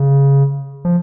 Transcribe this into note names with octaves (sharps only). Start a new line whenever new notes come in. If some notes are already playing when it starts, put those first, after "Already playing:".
Already playing: C#3
F3